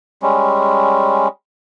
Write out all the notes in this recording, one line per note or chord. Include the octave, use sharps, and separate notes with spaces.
G3 G#3 C#4